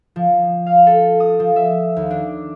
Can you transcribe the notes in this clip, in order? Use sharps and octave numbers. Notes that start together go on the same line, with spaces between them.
F3
F5
A4
D#6
F3
E5
D#2
D4